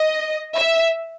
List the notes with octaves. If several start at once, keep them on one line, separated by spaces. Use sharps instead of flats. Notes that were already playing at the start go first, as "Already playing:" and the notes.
Already playing: D#5
E5